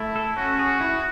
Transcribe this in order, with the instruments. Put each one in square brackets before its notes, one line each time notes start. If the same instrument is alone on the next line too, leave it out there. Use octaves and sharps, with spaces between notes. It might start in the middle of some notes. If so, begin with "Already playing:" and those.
Already playing: [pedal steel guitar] A3 [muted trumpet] E4
[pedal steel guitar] A4
[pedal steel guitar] C#4 [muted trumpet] F#4
[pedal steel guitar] G#4
E4